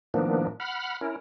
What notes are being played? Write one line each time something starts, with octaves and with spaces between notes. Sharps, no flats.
A2 D#3 F3 A#3 B3 D4
F#5 B5 F6
C#4 E4 A#4